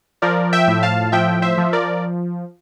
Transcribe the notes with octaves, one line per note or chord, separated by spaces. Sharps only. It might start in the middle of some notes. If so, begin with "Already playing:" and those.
F3 A#4 D5
E5 G5
A2
F5 A5
F3 E5 G5
C5 E5
F3
A#4 D5